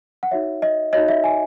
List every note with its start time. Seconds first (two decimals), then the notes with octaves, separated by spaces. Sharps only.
0.23 F#5
0.31 D#4 F#4 C#5 E5
0.62 D#5
0.93 D#4 F#4 C#5 D#5
1.08 E5
1.24 G#5